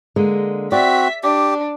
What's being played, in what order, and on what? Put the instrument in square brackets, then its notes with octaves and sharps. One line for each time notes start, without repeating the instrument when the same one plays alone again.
[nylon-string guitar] D3 G#3 A#3
[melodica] C4 F#4 [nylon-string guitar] D5 [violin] E5 B6
[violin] D4 [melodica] G4